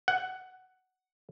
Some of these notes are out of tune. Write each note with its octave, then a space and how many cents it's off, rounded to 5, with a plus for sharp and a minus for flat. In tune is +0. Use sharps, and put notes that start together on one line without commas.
F#5 +10